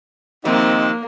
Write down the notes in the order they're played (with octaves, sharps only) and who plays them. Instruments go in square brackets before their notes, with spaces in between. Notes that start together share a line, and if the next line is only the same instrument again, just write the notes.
[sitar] C3 D#3 F3 [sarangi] A#3 [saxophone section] C4 D#4